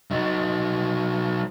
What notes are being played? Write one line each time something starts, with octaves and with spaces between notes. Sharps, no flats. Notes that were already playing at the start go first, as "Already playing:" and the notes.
F#3 D#4